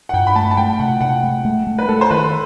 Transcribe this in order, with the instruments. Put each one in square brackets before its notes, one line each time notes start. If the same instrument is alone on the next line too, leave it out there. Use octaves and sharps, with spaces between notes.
[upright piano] F#5
[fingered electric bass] G2 [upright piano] G5
[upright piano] B5
[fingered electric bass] A3 [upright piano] A5
[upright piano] A5
[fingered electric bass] A3 [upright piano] G5
[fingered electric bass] C3 [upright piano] F#5
[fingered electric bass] C3 [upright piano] F#5
[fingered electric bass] A3
A3
A3
[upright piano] B4
[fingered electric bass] A3 [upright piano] A4
[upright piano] C5
[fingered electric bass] D#3 [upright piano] B4